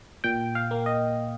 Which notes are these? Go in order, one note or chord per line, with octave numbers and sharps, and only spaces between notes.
A#2 G5
F5
A#3
D#5